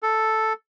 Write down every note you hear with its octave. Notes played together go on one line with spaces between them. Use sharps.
A4